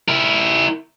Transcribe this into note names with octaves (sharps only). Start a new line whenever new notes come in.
E4 A#4